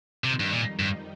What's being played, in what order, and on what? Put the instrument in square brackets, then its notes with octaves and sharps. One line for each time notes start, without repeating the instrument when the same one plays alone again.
[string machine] F2 D#3 G3 D#4 [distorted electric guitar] C3
[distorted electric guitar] G2
A#2
G2